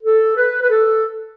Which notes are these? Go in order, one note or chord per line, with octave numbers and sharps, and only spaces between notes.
A4
B4
B4
A4